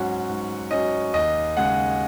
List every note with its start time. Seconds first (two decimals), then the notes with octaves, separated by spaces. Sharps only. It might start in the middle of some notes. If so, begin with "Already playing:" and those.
Already playing: G#2 F#3 C#4 F#5
0.29 G#2
0.71 F#3 C#4 D#5
1.14 D#2 D#5
1.57 C#3 G#3 F#5